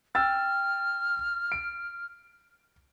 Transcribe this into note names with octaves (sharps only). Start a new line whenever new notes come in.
G5 E6 F6 A6
D7